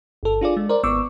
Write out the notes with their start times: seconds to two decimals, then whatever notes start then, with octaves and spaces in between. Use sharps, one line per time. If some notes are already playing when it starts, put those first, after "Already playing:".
0.23 G1 A4
0.41 D4 F4 G#4 D5
0.57 G#3
0.69 A#4 C5 D5
0.83 G#1 B3 C#6 D6 E6